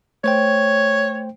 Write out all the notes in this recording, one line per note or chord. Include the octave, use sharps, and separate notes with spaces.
A3 C5 C#5 G5